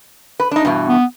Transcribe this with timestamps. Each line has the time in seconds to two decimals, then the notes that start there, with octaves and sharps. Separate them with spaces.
0.40 B4
0.51 D4 D#4
0.65 G2 B2 E3
0.89 B3